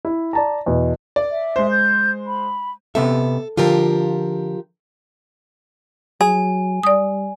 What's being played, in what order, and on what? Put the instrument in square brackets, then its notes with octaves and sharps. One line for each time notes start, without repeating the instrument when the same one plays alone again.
[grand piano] E4
D5 A5 A#5
E2 B2
D5
[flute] E5
[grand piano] G#3 C5
[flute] G6
B5
[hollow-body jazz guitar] C3 B3 E5 [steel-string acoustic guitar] A4
[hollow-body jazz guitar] D3 F3 [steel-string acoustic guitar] F4 G4 A#4
[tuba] F#3 [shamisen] G#4 [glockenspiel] G#5
[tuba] G3 [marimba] D5 D#6